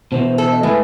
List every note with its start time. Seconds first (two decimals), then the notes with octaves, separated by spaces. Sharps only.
0.12 B2 E3 C5
0.38 A4 C5
0.51 D#5
0.63 A2 G#3 A3 G#4 B4